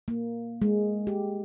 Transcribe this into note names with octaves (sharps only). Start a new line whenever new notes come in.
A#3
G#3
G4